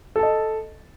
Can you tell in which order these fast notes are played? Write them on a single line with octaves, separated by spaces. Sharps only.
A4 A5 D#5